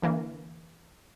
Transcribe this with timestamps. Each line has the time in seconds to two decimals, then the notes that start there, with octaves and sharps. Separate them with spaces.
0.02 D3 E3 A#3